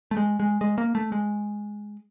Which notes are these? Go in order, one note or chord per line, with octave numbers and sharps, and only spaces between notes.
A3
G#3
G#3
G#3
A#3
A3
G#3